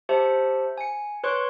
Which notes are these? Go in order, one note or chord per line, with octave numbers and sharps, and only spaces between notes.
G4 C5 E5 A5
G#5 C#7
B4 C#5 C6 C#6 F#6